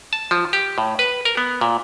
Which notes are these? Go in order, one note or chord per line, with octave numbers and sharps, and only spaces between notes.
A5
F3
G4
A2
B4
A#4
B3
A#2